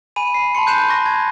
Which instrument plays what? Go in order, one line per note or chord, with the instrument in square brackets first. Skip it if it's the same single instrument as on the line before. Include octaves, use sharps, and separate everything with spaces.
[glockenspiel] G#5 B5 D#7
C7
A5 B5 C6 C#7
F#6 G6 C7 C#7 E7
A5 C#6 A#6
G#6